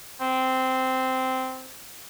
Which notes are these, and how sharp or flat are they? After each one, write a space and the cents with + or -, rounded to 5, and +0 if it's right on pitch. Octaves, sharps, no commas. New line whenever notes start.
C4 -10